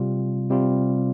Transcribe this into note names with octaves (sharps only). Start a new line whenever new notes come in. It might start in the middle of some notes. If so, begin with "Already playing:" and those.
Already playing: C3 G3 C4 F4
C3 G3 C4 F4